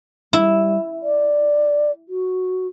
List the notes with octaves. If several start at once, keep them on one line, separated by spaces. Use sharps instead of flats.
G3 E4
D5
F#4